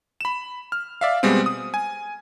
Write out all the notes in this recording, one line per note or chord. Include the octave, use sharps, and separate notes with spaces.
B5 E7
F6
D5 E5 F5
B2 G3 G#3 B3 C4
D#6
G#5